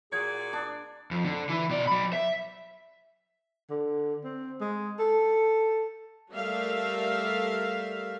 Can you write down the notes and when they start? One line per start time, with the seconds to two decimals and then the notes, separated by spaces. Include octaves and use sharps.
0.13 A#2 F#4 G#4 D5 G#6
0.53 D4
1.11 F2
1.25 D3
1.49 E3 E4
1.69 B2 D5
1.87 F#3 B5
2.13 E5
3.70 D3
4.24 C4
4.60 G#3
4.99 A4
6.32 G3 A3 A#4 E5 F5